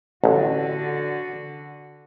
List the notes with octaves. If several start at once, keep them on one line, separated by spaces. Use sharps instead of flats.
A1 D3 F#4